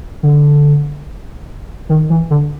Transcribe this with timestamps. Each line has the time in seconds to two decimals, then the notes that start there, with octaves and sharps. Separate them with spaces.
0.23 D3
1.89 D#3
2.10 E3
2.30 D3